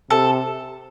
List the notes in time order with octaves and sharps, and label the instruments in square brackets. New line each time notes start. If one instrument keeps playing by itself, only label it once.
[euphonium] C3 [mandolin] A4